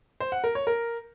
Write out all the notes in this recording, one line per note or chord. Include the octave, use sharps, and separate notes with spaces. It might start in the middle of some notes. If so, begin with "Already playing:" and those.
C5
F#5
A#4
C#5
A#4